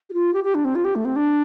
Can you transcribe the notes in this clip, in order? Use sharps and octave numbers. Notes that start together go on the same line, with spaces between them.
G4
F4
G4
G4
D4
C4
F4
G4
A3
C4
D4